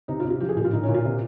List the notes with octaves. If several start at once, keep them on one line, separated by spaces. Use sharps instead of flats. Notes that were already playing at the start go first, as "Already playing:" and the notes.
C3 D#4
F4
C3
F4
F3 G4
G#4
A#2 G4
F4
A#2 D#4
C#4
A#2
F4
C3